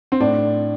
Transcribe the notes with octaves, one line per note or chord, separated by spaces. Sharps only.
C4
A2 D4